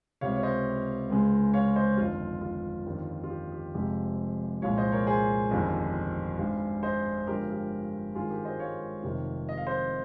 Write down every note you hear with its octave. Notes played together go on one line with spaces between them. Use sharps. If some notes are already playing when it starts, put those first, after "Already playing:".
C#2 C3 G3 C#5 F5
C#5
C5 D#5
C#2 C#3 G#3
C#5 F5
C5 D#5
G1 F2 D#3 F4
F4
G1 F2 D#3 G3
F4
G4
G4
F1 F2 C3 F3 G#3 G4
C2 A#2 F3 G#3 C#5 F5
C5 D#5
A#4 C#5
G#4 C5
G1 F2 D#3 G3
G#1 G2 G3
C5 D#5
G1 G2 F3 G#3 G4 A#4
G4
G#1 G2 D#3 G#3 F4 G#4
G4 A#4
C5 D#5
C#5 F5
F1 F2 C3 D#3
D#5
F5
C5 D#5